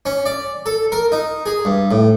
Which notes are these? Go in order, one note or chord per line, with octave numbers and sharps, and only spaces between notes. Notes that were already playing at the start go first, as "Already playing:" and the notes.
C#4
D5
A4
A#4
D#4
G#4
G2
A2